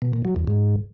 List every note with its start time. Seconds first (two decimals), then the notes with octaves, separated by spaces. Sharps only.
0.02 B2
0.13 A#2
0.25 F#3
0.36 E2
0.47 G#2